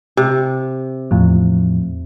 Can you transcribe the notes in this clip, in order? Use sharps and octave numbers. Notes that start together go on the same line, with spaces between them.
C3
E2 A2 F3